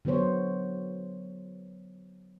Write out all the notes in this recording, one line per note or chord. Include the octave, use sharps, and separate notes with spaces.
D3 F#3 B3 C5 C#5